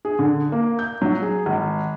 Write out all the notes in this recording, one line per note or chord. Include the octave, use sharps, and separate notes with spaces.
G#4
D3
A#3
G6
F#3
G#4
G#1